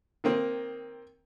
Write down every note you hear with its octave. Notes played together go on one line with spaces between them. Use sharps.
D#3 A#3 C4